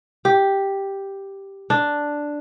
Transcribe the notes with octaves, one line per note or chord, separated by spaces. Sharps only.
G4
D4